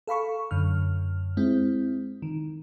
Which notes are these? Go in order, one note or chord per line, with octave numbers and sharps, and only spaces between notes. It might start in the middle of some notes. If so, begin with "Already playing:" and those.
A4 F5 B5 C#6
F#2 D3 F6
G#3 C4 E4
D#3